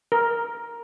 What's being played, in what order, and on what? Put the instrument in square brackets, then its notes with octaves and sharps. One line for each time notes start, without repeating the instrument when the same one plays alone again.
[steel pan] A#4